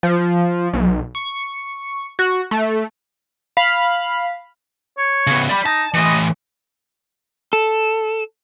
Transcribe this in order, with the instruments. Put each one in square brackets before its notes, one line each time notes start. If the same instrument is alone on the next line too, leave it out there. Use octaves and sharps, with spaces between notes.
[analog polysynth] F3
B1
C#6
F#4
A3
[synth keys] F5 B5
[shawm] C#5
[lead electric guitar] C#3 B3
D5 B5
[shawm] D#4 [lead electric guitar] A5
[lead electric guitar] A2 E3 [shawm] D#5
[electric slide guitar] A4